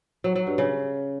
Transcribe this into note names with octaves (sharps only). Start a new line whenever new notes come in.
F#3
F#3
G2
C#3